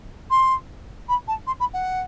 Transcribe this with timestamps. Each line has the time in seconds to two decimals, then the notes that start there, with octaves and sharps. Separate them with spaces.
0.30 C6
1.08 B5
1.27 A5
1.47 C6
1.60 B5
1.73 F#5